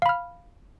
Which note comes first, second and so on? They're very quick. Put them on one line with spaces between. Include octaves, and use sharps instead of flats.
F5 B5 F6